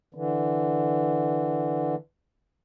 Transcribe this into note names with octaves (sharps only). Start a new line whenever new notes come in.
D3 E3